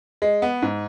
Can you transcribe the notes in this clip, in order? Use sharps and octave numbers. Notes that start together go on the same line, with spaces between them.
G#3
B3
G#2